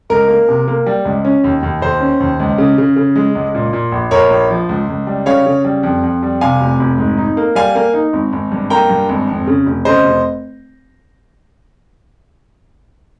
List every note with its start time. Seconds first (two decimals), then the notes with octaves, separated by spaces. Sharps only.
0.10 C#2 A#4
0.28 A#3
0.48 C3
0.68 A#3
0.86 G3
1.05 C#2
1.25 C#4
1.44 D#2
1.63 D#2
1.81 D#2 C5
2.00 C#4
2.20 D#2
2.40 C#2
2.58 C#3
2.78 C#3
2.96 C#3
3.16 G#3
3.35 C#2
3.55 A#2
3.73 A#2
3.92 A#1
4.11 A#1 A#4 C#5
4.30 A#1
4.50 F3
4.69 C#2
4.89 C#2
5.07 G3
5.26 C#3 C#5 F5
5.46 C#3
5.65 G3
5.83 F2
6.03 F2
6.23 G3
6.41 C3 F5 G#5
6.61 F1
6.80 F1
6.98 G#2
7.17 D#4
7.37 A#3
7.55 G3 F5 G#5
7.75 A#3
7.94 D#4
8.13 G#1
8.33 G#1
8.52 G2
8.70 A#3 G5 A#5
8.89 G2
9.09 G#1
9.29 F2
9.47 C#3
9.66 F1
9.85 C#3 C5 D#5
10.04 F1